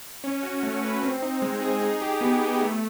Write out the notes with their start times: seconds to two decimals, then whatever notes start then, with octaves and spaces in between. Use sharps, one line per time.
0.24 C#4
0.43 F#4
0.63 A3
0.83 B4
1.03 C4
1.22 D#4
1.42 G#3
1.62 G#4
1.81 D#4
2.02 G4
2.21 B3
2.41 B3
2.61 A3